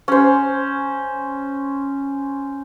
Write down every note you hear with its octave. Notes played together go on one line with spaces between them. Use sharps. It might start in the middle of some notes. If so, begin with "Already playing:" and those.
C#4 C5